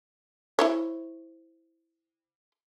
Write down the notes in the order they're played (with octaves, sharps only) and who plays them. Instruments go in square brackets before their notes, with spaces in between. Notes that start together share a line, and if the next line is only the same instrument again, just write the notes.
[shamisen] E4 C5 C#5